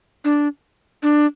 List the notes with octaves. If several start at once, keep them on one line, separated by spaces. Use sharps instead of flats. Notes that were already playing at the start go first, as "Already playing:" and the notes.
D4
D4